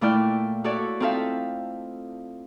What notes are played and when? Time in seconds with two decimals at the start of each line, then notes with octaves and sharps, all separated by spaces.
0.01 A#2 A3 E4 D5 G5 F6
0.64 F#4 A4 C#5 D5 E5
1.00 C4 D#4 F4 A4 E5 F5